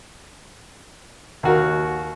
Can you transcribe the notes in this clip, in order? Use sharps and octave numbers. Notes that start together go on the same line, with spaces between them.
D#2 F#4 A#4